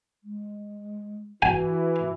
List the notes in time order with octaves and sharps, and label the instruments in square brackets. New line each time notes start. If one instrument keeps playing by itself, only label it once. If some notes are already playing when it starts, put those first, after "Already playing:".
[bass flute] G#3
[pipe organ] E3 [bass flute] F#4 [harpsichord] G#5